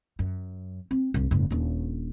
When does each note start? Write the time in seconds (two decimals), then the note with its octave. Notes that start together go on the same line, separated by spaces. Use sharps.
0.19 F#2
0.91 C4
1.14 C2 G2
1.31 F#1 G#2
1.50 D#1 D4